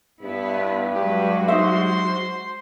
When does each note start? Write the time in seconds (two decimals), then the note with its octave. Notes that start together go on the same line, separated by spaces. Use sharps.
0.22 G2 B3 E4 B4
0.96 F#3 G#3 F#4 G4 B4
1.48 D#4 C5 E5 C6